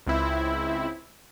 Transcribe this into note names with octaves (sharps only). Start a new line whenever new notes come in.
C#2 C4 E4